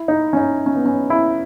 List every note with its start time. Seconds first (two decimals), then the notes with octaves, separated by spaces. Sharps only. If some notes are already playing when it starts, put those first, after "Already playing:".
Already playing: E4
0.08 D#4
0.33 C#4
0.37 D#4
0.66 C#4
0.76 B3
0.86 C#4
1.10 E4